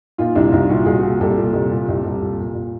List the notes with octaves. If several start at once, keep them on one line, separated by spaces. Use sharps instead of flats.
A#2 D#4 F4
C2 D4 E4
C2 D#4 F4
A#2 E4 F#4
C2 F#4 G#4
A#2
C2 G4 A4
A#2
C2
A#2
C2
C2
A#2
A#2
A#2